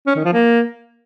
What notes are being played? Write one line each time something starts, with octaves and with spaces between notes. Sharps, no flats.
C#4
D#3
F3
A#3